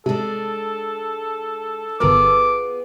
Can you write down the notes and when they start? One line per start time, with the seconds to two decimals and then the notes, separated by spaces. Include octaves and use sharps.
0.06 C3 G#3 D4 A4
2.00 G1 B3 F4 G#4 A#4 D6